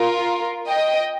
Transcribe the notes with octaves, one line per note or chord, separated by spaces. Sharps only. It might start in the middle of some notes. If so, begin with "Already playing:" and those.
Already playing: F4 A#4
D#5 G5